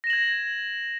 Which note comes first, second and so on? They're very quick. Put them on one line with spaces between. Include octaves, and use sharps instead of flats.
A#6 E7 F#7 G#6